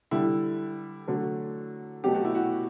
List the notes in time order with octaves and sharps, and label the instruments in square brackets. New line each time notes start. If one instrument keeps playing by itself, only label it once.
[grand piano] D3 G3 E4
D3 F#3 A3
B2 F#3 A3 G4
F#4
E4
F#4